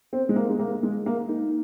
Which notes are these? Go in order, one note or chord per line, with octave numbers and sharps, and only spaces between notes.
C4
G#3
A#3
G#3
A#3
G#3
A#3
D#4